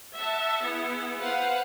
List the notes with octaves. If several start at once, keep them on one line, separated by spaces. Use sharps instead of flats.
E5 F#5 A5
B3 E4 G#4
B4 C5 F5 F#5